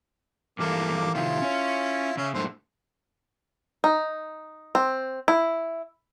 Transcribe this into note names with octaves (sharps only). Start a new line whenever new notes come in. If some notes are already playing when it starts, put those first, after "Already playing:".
G2 E3 A#3 A4 D6
A2 C3 D#3 E4 F4
C#4 C#5
C#3 C#4 E5
F#2 A2 D3 C5
D#4
C4
E4